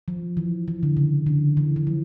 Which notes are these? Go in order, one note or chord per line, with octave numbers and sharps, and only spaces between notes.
F3
E3
E3
D3
C#3
D3
E3
E3
F3